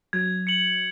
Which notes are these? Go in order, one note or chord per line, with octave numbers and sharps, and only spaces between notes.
F#3 G#6
C#7 F#7